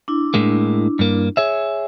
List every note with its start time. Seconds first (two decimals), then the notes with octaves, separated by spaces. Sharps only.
0.08 D4 E4
0.34 A2 G#3 A#3
0.99 G2 A#3
1.37 G#4 C#5 E5